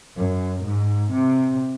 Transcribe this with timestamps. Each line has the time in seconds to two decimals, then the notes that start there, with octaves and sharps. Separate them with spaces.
0.16 F#2
0.64 G#2
1.12 C3